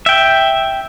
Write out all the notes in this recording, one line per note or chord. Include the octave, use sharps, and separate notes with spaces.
E5 G5